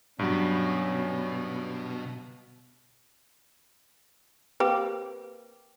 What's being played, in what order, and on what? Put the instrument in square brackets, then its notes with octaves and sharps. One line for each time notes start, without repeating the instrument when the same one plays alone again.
[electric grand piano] G2 F#3 [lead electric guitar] B2 [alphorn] C#4
[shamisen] A#3 C4 G4 [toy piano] B4